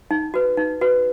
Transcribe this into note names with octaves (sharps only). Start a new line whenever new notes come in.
D#4
F#4 B4
D#4
F#4 B4